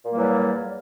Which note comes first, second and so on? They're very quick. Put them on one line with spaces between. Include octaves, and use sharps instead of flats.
A#2 A#3 G3 F#3 E2